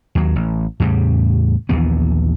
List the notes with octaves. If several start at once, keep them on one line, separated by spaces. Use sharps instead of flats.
D#2 F#3
A1
E2 A2 C#3 G3
A#1 D#2 E3 B3